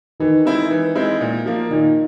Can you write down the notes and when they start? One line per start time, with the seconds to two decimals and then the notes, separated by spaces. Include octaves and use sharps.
0.20 D#3 E3
0.45 G#3 C4 E4
0.71 E3
0.95 G#3 C4 E4
1.21 A#2
1.46 F3 A#3
1.71 A#2 D#3